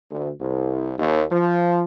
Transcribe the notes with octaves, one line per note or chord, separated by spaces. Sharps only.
D2
C2
D#2
F3